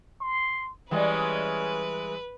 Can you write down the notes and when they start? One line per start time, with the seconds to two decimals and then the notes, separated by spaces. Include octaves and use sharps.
0.21 C6
0.91 E3 G3 G#3 C#4 B4